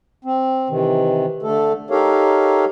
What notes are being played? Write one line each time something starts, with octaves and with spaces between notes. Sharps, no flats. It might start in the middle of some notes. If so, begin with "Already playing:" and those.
C4
C3 D#3 E3
D3 A3 A4
D#4 G4 A4 A#4 C#5 F5